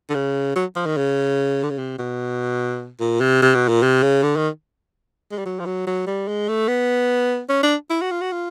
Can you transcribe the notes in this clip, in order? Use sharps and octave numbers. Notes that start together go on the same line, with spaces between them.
D3
C#3
F#3
F3
D#3
C#3
D3
C#3
C3
B2
A#2
C3
C3
B2
A#2
C3
C#3
D3
D#3
G#3
G3
F#3
F3
F#3
F#3
G3
G#3
A3
B3
C#4
D4
E4
F#4
F4
F#4
F4